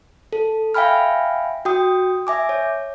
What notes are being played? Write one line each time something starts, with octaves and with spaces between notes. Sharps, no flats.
A4
E5 F5 G5 G#5 B5 F6
F#4 G5 D#6
E5 G#5 D6
C#5